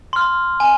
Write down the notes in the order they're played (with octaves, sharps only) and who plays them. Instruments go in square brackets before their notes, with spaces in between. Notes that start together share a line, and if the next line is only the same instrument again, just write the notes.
[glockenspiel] C6 F6
G#5